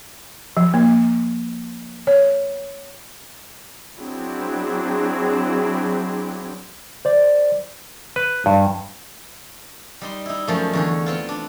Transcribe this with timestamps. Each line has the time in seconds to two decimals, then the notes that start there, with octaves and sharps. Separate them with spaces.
0.57 F3
0.74 A#3
2.07 C#5
4.00 F#3 C4 D4 E4 G#4
7.05 C5 D5
8.16 B4
8.46 G2
10.01 G3 D#4 C6
10.26 D#4 E4
10.47 F#2 F3 A3
10.73 E2 D3 C#5
11.06 B3 C4 F4
11.29 D4